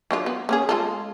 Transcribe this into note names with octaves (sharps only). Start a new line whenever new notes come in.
F#3 D4 F4
B3
A#3 C#4 G#4
G#3 F4 A4